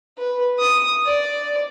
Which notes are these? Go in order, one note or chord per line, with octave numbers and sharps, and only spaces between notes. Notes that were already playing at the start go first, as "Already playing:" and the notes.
B4
D#6
D5